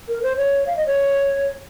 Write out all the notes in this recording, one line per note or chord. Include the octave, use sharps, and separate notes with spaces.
A#4
C5
C#5
F5
D#5
C#5